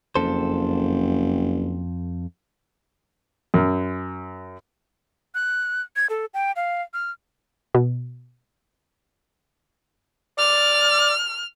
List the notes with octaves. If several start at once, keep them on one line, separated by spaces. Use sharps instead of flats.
F#1 F2 A4 C5
F#2
F#6
G#6
A4
G5
F5
F6
B2
D5 F6